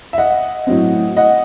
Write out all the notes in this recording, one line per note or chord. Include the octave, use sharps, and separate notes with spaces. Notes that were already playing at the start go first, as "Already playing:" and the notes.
E5
D#5 F#5
A2 F#3 C4
D#5 F#5